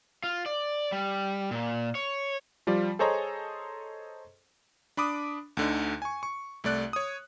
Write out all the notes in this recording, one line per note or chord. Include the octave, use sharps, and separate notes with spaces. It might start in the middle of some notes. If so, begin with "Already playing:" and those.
F4
D5
G3
A#2
C#5
F3 G3 F4 D5
G#4 A4 C5 C#5 D#5 A#5
D4 B5 D6 D#6
D2 D3 D#4
G#5 C#6
C#6
C2 A3 D5 F#6
C#5 D#6